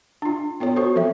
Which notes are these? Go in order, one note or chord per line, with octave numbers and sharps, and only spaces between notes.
D4 F4
B3 F4 A4 C#5
F#4 A4 C5 C#5
F3 C4 A4 E5